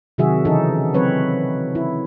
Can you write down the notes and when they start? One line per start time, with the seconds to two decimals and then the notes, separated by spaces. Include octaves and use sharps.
0.18 C3 D#3 F#3 F#4 G#4 E5
0.45 C#3 E3 D#4 G#4 A4
0.94 F#3 C4 B4 C#5
1.75 E4